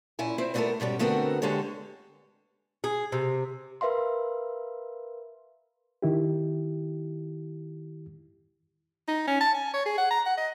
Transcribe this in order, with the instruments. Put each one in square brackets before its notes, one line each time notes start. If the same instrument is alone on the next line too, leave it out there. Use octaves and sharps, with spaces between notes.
[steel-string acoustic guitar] A#2 C#4 E4 G#5
C4 E4 C5
G3 A3 B3 E4 A4 A#4
G#2 B2 G3 C#4
D3 A3 B3 C4 F#4 A#4
D3 G#3 G4 A4 C#5
[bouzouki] G#4
C3
[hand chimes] A#4 B4 E5 F5 C6
[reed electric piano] D#3 E4 G4
[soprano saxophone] D#4
C#4
A5
G#5
C#5
G#4
F#5
A#5
F#5
D#5